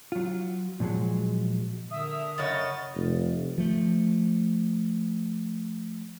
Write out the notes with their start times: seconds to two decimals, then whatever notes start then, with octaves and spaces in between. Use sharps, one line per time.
0.12 F#3 F4
0.80 A#2 F3 F#3 G#3
1.91 D3 A#4 E5 D#6
2.38 F#2 C#3 C#5 D#5 A6
2.95 F1
3.58 F3 A3